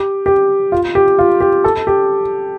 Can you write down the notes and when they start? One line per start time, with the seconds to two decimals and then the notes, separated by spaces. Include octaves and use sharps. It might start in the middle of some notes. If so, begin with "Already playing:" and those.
Already playing: G4
0.26 G4
0.72 F4
0.95 G4
1.19 F4
1.41 G4
1.64 A4
1.87 G4